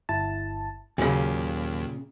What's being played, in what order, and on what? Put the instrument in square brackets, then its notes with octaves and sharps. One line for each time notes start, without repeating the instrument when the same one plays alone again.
[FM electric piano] G1 E4 A5
[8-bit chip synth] D#2 [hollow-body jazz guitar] A#2 C#3 [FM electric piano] F#3